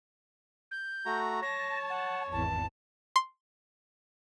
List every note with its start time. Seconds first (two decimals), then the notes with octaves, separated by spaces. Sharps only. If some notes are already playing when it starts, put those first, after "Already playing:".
0.71 G6
1.06 A3 F#4 A#5
1.42 C#5 A5 A#6
1.90 F#5
2.32 G#1 E2 A5
3.16 C6